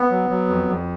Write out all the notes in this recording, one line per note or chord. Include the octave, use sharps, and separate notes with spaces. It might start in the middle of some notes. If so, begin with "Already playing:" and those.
Already playing: B3
F#3
F#3
F2
F2